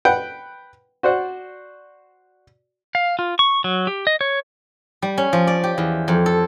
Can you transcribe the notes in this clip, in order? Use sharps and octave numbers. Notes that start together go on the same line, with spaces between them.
B4 F#5 G5
F#4 C5 D5 F#5
F5
F4
C#6
F#3
G4
D#5
C#5
G3
C#4
F3
D5
G4
E2
F2
A4